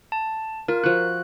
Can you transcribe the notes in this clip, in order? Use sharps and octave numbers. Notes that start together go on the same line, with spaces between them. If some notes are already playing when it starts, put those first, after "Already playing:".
A5
F4 A#4
F3 F#4 F#6